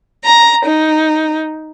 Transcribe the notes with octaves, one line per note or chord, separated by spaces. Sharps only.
A#5
D#4